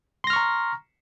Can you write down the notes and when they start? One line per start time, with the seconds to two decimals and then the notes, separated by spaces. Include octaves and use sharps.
0.24 C6
0.27 A#6
0.30 F6
0.33 C#6
0.36 A#5